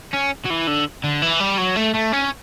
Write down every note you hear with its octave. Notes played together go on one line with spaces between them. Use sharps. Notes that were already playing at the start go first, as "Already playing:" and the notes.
C#4
F#3
E3
D3
D3
E3
G3
F#3
A3
A3
C#4